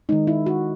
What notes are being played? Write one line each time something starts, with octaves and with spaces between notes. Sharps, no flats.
D#3 G#3 D#4
E4
F#4